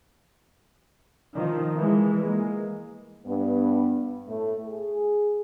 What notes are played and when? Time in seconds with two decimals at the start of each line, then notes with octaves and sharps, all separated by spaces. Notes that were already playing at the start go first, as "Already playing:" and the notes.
1.34 D#3 F3
1.76 E3 G#3
2.21 G#3 A#3
3.26 G2 B3
4.28 A2 A3
4.67 G#4